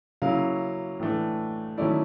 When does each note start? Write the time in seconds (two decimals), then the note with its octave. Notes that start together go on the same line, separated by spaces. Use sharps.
0.22 C#3 F#3 A#3 C#4 E4 F5
1.00 A2 E3 A3 D4
1.78 D#3 F#3 A3 C#4 E4 D5